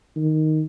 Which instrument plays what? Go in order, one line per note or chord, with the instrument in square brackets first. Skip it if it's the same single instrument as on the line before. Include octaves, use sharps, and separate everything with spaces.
[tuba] D#3